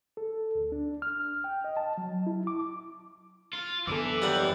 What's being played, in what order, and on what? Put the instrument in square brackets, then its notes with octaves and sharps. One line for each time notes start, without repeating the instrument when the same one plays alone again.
[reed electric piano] A4
D2
D4
F6
G5
D#5
A5
F#3
E4
D6
[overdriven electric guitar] F4
[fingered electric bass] F#2 D3 B3 [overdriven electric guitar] E3 E4 [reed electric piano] A4 D6
[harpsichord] D#2 G3 F#5 [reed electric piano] G4